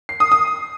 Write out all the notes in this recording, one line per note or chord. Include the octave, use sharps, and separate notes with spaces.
C7
D#6
D#6